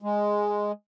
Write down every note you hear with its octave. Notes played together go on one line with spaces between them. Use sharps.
G#3